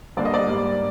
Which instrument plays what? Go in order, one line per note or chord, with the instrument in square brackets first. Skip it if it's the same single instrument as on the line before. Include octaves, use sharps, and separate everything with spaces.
[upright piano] G2 D3 G3 A#3 D5
D#5
D5
G#2 G3 A#3